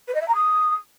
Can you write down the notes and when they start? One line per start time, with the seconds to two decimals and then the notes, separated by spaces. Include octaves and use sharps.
0.08 B4
0.14 D#5
0.21 E5
0.28 A#5
0.34 D#6